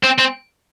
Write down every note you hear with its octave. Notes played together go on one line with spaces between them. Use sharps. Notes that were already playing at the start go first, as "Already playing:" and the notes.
C4
C4